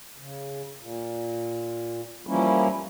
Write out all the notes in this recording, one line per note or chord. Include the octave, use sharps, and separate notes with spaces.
C#3
A#2
E3 F3 G3 A#3 C#4 E4